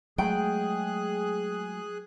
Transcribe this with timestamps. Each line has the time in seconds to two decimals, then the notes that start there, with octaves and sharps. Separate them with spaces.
0.18 F#3 G#3 A3 G#4 G5 F#6